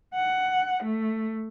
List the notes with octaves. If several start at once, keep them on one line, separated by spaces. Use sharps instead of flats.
F#5
A3